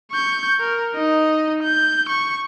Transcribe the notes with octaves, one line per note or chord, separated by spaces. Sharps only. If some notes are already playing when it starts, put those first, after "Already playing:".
C#6 G6
A#4
D#4 D#5
G6
C#6